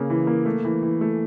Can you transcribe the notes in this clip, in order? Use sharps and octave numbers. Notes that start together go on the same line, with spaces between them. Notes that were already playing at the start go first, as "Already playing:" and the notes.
Already playing: C#3 A#3
E3
A#3
A3
E3
E3
A3